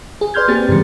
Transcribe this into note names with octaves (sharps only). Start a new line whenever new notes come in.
G#4
B4 D5 C6 F6 G6 G#6
A#3 C4 G4 G#4 A6
G2 C#3 E3 G#3